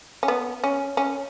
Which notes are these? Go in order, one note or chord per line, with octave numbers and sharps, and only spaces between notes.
C#4
B3
C#4
C#4